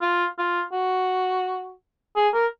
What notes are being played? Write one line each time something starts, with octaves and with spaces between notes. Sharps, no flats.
F4
F4
F#4
G#4
A#4